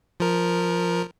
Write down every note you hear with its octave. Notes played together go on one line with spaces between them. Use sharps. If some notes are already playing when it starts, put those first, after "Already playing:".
F3 A#4